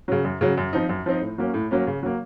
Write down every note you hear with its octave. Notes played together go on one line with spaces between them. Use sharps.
C#3 F#3
F#2
C#3 F#3
F#2
F3 C4 D#4
F#2
F3 C4 D#4
A2
F#3 A#3 C#4
A2
F#3 A#3 C#4
C#3
F#3 A#3